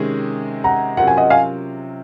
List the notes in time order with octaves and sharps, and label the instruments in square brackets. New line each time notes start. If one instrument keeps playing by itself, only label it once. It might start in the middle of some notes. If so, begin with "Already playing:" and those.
Already playing: [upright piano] C3 D#3 G#3 C#4 G#4
[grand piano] F#5 A#5
[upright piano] C3 F#3 C#4 F4 A#4 [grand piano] F#5
[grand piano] G#5
D#5 F#5
F5 G#5